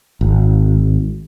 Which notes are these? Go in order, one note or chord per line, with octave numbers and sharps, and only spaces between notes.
G#1